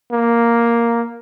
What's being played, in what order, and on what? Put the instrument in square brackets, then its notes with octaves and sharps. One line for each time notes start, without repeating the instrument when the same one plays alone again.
[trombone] A#3